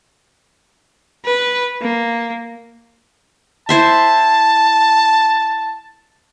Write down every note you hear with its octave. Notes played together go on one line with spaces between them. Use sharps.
B4
A#3
E4 C5 E5 A5